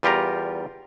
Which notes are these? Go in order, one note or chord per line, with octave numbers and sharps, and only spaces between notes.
E2 G3 F4 G4 A#4 A#5